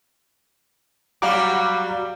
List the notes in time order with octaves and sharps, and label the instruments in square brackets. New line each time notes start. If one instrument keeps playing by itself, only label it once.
[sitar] F#3 G3 F#4 [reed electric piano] F5 A#5 D6